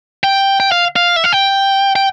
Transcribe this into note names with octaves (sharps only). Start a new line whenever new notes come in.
G5
G5
F5
F5
E5
F5
G5
G5